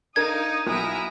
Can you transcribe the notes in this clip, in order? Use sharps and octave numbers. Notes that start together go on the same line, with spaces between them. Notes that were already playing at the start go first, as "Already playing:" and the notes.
D4 D#4 A#4 F5 D#6 G#6
B1 E4 A#5